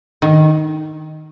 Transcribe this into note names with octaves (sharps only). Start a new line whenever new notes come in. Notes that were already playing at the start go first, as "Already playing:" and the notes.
D#3